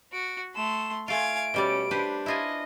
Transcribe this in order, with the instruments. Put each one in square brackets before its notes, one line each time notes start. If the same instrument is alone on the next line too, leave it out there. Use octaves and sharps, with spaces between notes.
[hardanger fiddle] F#4 [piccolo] D7
[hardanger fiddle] A3 C6 [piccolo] E7
[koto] A3 F4 [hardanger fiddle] F5 G#5 [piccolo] D7
[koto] B2 G3 D5 [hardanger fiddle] C#4
[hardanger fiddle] D4 [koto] G4 B4 C5
[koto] E4 F4 G#5 [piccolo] D#5